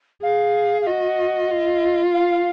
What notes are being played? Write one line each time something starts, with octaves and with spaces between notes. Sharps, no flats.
G#4 F5
F5
F#4 D#5
F4
F5